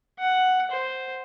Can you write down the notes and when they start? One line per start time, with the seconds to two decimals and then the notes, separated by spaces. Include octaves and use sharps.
0.19 F#5
0.71 C5